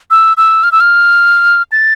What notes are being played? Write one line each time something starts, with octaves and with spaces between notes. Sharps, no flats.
E6
E6
F6
E6
F6
A6